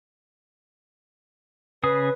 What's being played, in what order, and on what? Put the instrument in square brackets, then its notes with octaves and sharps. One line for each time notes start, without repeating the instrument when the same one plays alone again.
[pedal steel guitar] C#3 G#4 D#6 [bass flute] B4